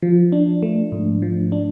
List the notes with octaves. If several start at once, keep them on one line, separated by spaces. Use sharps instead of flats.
F3
D4
A3
G#2
F3
D4